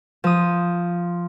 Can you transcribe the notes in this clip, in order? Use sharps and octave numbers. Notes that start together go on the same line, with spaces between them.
F3 D#6